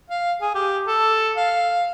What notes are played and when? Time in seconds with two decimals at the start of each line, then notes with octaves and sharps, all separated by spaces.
0.10 F5
0.41 G#4
0.55 G4
0.87 A4
1.37 F5